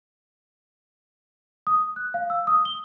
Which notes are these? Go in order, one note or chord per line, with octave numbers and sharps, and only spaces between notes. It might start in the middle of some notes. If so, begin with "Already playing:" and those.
D#6
F#6
F5
E6
D#6
G7